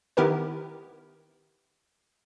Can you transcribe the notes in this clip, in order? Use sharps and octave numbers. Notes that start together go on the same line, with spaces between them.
D#3 B3 E4 G4 A#4 B4